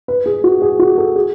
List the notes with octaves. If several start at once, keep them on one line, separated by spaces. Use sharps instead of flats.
B4
G#4
F#4
G#4
F#4
A4
G#4